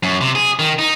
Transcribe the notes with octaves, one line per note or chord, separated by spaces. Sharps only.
F#2
C3
G#4
D#3
D#4